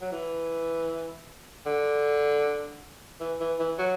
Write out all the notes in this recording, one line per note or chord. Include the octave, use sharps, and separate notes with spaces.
F#3
E3
D3
E3
E3
E3
F#3